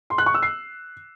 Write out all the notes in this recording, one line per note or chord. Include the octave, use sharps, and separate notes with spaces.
C6
F#6
C#6
E6
C7